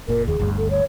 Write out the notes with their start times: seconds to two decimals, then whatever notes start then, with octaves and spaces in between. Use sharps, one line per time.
0.08 F#1 A#2 A#4
0.28 E1 D#2 G#4
0.39 G1 D2 G2
0.57 A4
0.70 C#5